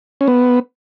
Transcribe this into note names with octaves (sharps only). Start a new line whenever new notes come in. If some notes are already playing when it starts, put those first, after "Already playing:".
C#4
B3